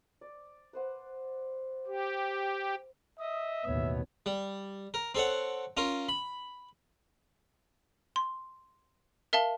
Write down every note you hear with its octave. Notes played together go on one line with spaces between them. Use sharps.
D5
B4 C5 F#5
G4
D#5 E5 D#6
A1 D#2 B2 B3 C#5
G3
A#4
C4 A4 C#5 F#5
C#4 F4 A#4
B5
C6
A#4 E5 F5 A5 G7